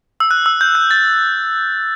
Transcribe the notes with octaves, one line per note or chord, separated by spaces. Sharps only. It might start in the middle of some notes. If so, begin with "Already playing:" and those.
E6
F#6
E6
G6
F#6
A6